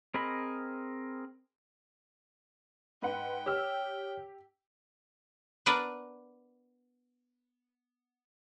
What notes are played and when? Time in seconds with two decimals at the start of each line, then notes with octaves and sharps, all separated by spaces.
0.14 C4 G#4 A#4 D#5 B5
3.02 G#2 B4 F#5 G5
3.46 G4 C#5 E6 F6
5.66 B3 D4 A#4 B4 D5